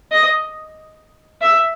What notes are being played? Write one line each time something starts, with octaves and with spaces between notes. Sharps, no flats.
D#5
E5